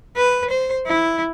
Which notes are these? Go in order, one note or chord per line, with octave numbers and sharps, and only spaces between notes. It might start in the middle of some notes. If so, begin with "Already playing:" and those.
B4
C5
E4